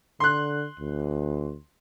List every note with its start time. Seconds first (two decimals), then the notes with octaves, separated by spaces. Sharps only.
0.20 D3 C6 F#6
0.80 D2